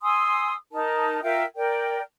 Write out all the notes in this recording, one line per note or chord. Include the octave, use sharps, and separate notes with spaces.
G#5 C6 D#6 E6
D#4 A#4 A5
F4 A#4 E5 G5
A#4 D5 G5